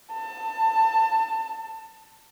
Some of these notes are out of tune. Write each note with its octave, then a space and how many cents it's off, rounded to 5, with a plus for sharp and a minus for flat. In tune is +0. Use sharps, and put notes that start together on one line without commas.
A5 +20